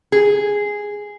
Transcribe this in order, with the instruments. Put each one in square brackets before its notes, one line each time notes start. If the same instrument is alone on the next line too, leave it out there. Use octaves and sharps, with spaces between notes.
[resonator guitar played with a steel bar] G#4